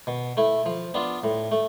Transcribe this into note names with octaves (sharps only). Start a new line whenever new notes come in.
B2
A3 E4
F3
B3 D4 F4
A2
A3